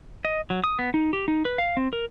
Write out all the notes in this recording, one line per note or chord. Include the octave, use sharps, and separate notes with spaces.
D#5
F#3
D#6
B3
D#4
G4
D#4
B4
F5
C4
A#4